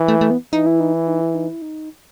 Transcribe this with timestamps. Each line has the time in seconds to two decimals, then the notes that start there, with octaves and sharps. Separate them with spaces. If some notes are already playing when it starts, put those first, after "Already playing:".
Already playing: E3
0.08 A3
0.21 A3
0.31 B3
0.53 E3 D#4
0.66 E4
0.80 D#4
0.93 E4
1.08 D#4
1.21 E4
1.35 D#4
1.48 E4
1.62 D#4